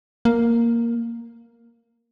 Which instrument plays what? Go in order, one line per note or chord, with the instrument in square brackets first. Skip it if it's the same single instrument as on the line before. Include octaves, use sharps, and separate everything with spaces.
[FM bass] A#3